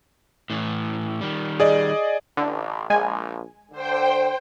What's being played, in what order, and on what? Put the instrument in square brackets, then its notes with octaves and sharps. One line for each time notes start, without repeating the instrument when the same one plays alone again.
[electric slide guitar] A2 E3
D#3 G3
[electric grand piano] G#4 D5 D#5
[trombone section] A1 [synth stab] D3
[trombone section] A#1 [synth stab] G#3 G#5
[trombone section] D3 [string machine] C5 G5